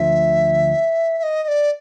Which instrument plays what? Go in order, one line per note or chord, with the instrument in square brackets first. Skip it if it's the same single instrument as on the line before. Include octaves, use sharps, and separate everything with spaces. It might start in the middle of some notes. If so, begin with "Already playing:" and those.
Already playing: [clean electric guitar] D2 D3 F3 [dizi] E5
[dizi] E5
D#5
D#5
D5